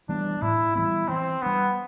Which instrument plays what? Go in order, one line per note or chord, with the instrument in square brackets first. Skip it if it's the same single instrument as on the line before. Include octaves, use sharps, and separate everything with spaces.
[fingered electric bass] E3 G3 B3 [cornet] D4
[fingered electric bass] A2 [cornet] E4
[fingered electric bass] E3 G3 B3 [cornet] E4
[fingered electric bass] E3 [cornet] C4
[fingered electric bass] G3 D4 [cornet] B3